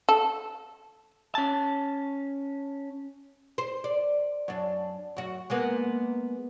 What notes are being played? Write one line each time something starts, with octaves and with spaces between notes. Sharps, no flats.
A4
C#4 A5
C5
D5
F#2 D4
F#2 F#4
G#3 A#3 B3